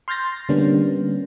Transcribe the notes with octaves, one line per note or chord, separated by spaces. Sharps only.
C6 F6 G6 A6 A#6
D3 G3 A#3 B3 C#4 D4